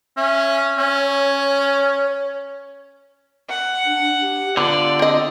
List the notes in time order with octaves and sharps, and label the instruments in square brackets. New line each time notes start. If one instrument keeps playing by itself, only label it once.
[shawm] C#4 [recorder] E5
[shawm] C#4 [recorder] C#5
[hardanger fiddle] F#5
[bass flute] D4
G4
[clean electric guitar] D3 [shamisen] B3 [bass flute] F4 [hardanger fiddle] D5
[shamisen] C4 D#5